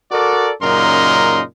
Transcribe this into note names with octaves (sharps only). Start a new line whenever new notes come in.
F#4 A4 A#4 D5
F#2 A#2 C#3 D#4 A#4 C6